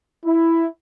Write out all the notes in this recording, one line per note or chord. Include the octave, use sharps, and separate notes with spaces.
E4